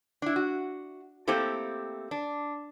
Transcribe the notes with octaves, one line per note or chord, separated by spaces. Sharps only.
D4 E4
F#4
A3 A#3 C4 E4 G4 A4
D4